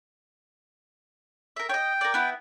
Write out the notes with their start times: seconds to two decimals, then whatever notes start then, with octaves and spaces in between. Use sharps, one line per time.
1.56 A#4 E5
1.69 C#5 D#5 G5
2.01 A#4 D5
2.14 B3 E4